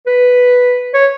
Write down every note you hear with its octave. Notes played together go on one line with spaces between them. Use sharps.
B4
C#5